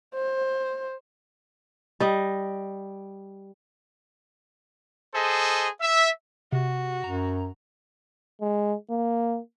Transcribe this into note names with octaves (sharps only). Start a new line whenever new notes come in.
C5
G3 D#5
G#4 A4 C5 D#5
E5
C3 F#4
F#2 A#5
G#3
A#3